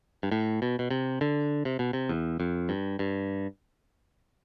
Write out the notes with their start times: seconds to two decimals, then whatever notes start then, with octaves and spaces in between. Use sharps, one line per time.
0.23 G2
0.31 A2
0.62 B2
0.79 B2
0.91 C3
1.21 D3
1.65 C3
1.79 B2
1.93 C3
2.09 E2
2.40 F2
2.69 G2
2.99 G2